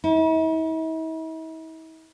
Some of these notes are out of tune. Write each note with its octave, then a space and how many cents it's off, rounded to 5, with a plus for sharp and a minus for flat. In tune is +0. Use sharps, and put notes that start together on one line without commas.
E4 -45